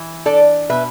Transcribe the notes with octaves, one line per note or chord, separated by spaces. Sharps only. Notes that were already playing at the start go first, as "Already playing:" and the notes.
Already playing: E3
D4 A4 D5
B2 B4 E5